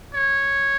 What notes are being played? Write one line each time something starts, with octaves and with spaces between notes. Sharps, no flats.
C#5